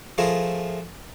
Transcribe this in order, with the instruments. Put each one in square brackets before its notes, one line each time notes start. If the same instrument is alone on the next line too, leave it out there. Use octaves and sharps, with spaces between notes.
[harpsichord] F3 A3 F4 G#4 A#4